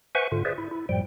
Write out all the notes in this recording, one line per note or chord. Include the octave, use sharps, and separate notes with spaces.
B4 C5 E5 F#5 G#5 C#6
G#2 D3 F4
G#4 B4 C5 D5 E5
E4
E4
F#2 A2 F3 G3 G5